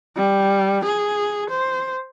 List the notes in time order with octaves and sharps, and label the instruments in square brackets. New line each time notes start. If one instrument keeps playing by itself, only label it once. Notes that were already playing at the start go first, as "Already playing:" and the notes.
[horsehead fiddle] G3
G#4
C5